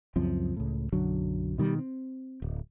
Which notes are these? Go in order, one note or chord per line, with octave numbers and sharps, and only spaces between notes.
C#2 F#2 F3 C4
C#2 A2
B1 F#2 D3 F#3
B2 D#3 G3
C4
D1